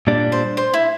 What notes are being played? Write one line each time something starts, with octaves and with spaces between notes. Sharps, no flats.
A#2 G3 D4
C5
C5
E4